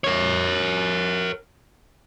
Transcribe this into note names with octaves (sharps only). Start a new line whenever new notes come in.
A#4 C#5